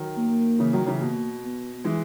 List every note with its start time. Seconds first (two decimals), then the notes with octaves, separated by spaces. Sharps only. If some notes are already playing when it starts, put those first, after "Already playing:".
Already playing: D#3 F#3
0.17 A#3
0.59 C#3 E3
0.73 D#3 F#3
0.87 C#3 E3
1.01 B2 A#3
1.43 B3
1.84 E3 G#3